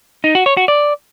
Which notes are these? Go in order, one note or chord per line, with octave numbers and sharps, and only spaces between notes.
D#4
F#4
C#5
F#4
D5